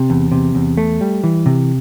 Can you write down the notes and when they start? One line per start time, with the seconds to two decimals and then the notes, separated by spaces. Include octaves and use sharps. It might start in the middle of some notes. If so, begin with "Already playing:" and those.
Already playing: C3
0.10 E2
0.32 C3
0.55 E2
0.78 A3
1.01 G3
1.24 E3
1.46 C3